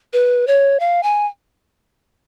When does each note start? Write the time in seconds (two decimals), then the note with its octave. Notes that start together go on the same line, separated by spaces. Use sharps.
0.13 B4
0.47 C#5
0.80 F5
1.03 G#5